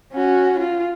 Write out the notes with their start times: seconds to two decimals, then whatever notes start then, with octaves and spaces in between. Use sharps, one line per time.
0.13 C#4 F#4
0.59 F4